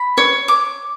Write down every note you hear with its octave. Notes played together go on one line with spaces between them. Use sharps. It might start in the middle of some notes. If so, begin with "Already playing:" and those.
Already playing: B5
C#5
D6